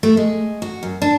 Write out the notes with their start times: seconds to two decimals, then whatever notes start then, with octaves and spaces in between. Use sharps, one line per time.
0.03 A3
0.17 G#3
0.62 F#4
0.83 F#2
1.02 D4